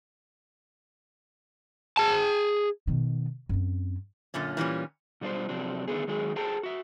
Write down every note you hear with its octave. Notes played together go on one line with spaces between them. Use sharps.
G#4 A5
B2 D#3
F#2 C4
F#2 A#2 D3 C#4
A#2 E3 G3 C#4
B2 G3 D4 F4 C5
C3 F3 F#3 C4 D4
D3 D#3 G#3 A3 B3 G#4
D#3 F#3 G#3 G#4
G#4 A4 C5 G5 A5 A#5
F#4 E5